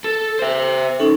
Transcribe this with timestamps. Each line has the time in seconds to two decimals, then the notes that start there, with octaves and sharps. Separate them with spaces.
0.04 A4
0.39 C5 E5
1.00 C#4 D#4 A4